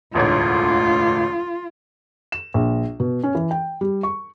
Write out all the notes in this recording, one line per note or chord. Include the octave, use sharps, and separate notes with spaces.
E1 A1 D2 F4
E7
A#1
B2
C#4
E3
G5
G3
C#6